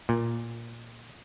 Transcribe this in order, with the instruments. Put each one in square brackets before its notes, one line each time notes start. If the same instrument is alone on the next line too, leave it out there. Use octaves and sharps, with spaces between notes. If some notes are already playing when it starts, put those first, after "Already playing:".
[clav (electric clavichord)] A#2